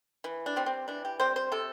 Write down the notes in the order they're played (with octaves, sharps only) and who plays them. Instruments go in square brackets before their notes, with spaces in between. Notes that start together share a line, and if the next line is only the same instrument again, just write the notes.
[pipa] E3
D4
G3 C4
C4
E3 D4
G4
G3 C4 C5
C5
C3 A4